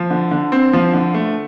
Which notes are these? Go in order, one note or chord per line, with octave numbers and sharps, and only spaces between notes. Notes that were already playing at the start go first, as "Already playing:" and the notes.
Already playing: F3
D3
D3
C4
F3
D3
A3